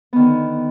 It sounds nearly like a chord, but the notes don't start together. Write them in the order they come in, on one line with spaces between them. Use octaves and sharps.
B3 D#3 D3